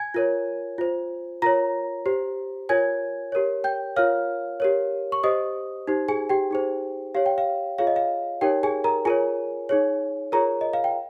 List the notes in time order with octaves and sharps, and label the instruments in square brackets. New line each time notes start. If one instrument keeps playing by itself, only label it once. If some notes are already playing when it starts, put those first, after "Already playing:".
Already playing: [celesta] G#5 G#6
F4 A#4 C#5
F4 C5
F4 A#4 C#5 A#5 A#6
G4 C5
F4 A#4 C#5 G#5 G#6
G4 A#4 C#5
G5 G6
F4 A#4 C#5 F5 F6
G4 A#4 C#5
C#6
G4 C5 D#5 D#6
D#4 G4 C5
G#4 G#5
G4 G5
D#4 G#4 C5
G4 C#5 F5
G5
F5
F4 G#4 C#5 F5
D#5
F5
D#4 G4 A#4 C#5 G5
G#4 G#5
A#4 A#5
F4 G#4 A#4 C#5 G#5
D#4 G#4 C#5
F4 G#4 A#4 C#5 A#5
D#5
F5
G5